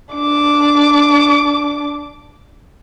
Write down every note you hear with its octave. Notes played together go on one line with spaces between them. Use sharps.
D4 D6